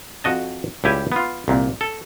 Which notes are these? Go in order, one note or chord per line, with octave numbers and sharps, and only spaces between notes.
F2 F#4 D#5 A5
C#2 G3 E4 G4 G#5
B3 F4
C2 A#2
A4